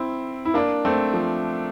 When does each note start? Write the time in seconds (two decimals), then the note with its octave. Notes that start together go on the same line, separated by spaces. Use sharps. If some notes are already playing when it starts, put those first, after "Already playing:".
Already playing: C4 E4
0.45 E4
0.54 A#3 D4
0.85 A3 C4
1.13 F3